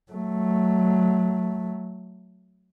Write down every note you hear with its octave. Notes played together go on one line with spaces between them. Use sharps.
F#3 A3